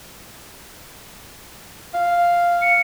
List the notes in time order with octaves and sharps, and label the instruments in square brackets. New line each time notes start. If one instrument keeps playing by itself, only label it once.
[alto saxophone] F5
[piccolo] C#7